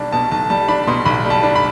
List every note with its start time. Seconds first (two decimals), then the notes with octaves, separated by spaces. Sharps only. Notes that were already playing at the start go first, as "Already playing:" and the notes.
Already playing: B1 G3 D4 A5
0.12 B2 A5
0.31 B1 A5
0.50 G3 A5
0.68 D4 B5
0.87 B2 C6
1.05 B1 B5
1.25 G3
1.30 A5
1.43 D4
1.56 B5